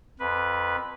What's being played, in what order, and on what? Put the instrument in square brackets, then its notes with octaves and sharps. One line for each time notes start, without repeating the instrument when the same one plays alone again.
[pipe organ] F2 B4